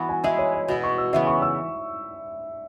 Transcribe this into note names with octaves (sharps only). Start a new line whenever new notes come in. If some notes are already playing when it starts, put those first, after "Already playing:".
Already playing: E3 B3 F#4 B5
G#5
G#3 E4 G#4 B4 E5
C#5
C#5
B2 B3 E4 B5
C#6
E6
C#3 E3 B3 E5
C#6
E6